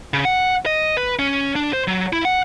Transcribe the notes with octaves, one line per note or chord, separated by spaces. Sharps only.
C#3
F#5
D#5
B4
C#4
D4
C5
F#3
E4
F#5